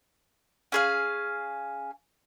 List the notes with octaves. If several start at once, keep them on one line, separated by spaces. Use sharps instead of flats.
C#4 G#4 F5